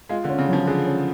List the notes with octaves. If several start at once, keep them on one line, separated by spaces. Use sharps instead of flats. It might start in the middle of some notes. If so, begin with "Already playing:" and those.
G#3 F4
D3
C#4
C#3
F3 F#3
D3 G#4
C#4